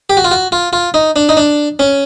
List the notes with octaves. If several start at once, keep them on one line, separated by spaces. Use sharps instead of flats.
G4
F#4
F4
F#4
F4
F4
D#4
D4
D#4
D4
C#4